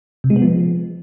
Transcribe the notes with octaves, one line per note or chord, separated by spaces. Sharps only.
C3
G#3
B3
F3